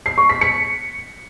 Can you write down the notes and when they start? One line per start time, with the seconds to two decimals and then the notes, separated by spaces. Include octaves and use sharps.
0.06 C7
0.18 C#6
0.30 B6
0.41 C#7